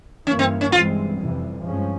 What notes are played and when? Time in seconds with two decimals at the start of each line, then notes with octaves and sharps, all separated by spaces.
0.27 G2 E3 A#3 C#4
0.39 C4
0.61 C#4
0.72 G2 E3 G#3 C4 F4
1.18 F2 C3 E3 G3
1.63 G2 F3 G#3 C#4